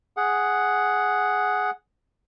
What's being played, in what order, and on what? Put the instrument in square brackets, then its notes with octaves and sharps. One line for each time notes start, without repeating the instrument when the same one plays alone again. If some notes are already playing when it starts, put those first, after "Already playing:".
[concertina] G#4 F#5